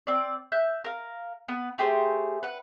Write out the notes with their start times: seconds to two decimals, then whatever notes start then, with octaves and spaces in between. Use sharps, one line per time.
0.07 C4 D5
0.52 E5 F#6 G6
0.84 A#4 F5
1.48 B3 B4
1.78 A3 G4 G#4 C5
2.43 B4 F#5